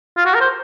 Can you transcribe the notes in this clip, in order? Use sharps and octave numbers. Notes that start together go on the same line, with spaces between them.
F4
F#4
A#4
C5